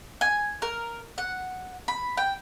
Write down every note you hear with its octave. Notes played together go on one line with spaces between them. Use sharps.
G#5
A#4
F#5
B5
G5